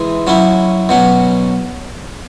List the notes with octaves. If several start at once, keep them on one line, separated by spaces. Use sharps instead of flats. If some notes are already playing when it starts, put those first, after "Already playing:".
Already playing: E3 G#3 E4
F#3 C#4 E4
B2 F#3 C#4